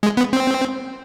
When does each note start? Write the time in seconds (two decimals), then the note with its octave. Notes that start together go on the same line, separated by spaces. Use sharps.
0.03 G#3
0.17 B3
0.33 C4